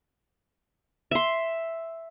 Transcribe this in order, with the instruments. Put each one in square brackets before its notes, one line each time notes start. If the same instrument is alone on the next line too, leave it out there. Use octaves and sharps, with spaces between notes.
[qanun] E5 C6